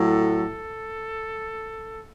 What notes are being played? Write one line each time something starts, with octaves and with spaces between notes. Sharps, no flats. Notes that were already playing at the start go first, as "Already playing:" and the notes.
Already playing: A2 F#3
A4